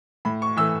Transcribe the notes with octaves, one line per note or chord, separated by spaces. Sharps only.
A2 B5
C#6
E3 A3 E6